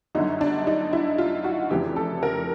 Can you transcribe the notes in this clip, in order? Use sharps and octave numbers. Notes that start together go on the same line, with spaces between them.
G1 F#2 D3 D#4
D4
D#4
E4
F4
F#4
F1 F2 C#3 E3 G4
A4
A#4